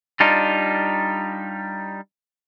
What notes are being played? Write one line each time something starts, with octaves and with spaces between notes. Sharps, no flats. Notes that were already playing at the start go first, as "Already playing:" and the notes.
G3 D4 D#4 F4